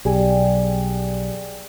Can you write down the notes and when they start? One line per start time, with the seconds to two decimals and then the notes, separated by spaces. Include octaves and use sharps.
0.05 B1 G3 G4 G#4 G#5